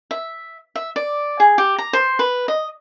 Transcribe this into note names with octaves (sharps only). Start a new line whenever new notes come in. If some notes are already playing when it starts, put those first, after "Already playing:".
E5
E5
D5
G#4
G4
A#5
C5
B4
D#5